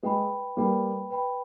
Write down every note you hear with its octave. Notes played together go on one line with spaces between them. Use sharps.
G#3 B4 G5 B5
G3 A#3 B4 G5 B5
B4 G5 B5